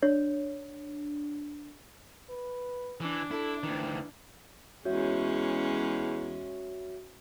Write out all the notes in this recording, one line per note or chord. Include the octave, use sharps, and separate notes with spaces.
D4 C#5
B4
E3 D4
E4 A4
D2 D#3 E3
E2 G#3 C#4 F#4 C#5 E5